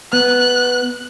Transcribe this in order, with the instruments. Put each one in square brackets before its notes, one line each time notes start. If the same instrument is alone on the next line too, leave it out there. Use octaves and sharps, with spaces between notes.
[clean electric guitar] B3 [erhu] F#6